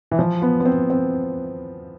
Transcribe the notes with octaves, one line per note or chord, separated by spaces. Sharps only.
E3
F3
B3
B3
C4
C4